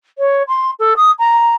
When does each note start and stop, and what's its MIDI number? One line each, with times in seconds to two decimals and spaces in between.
0.18 0.43 73
0.48 0.71 84
0.79 0.94 69
0.97 1.11 87
1.19 1.55 82